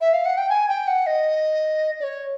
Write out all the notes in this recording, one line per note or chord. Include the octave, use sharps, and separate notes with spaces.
E5
F5
F#5
G5
G#5
G5
F#5
D#5
D5
C#5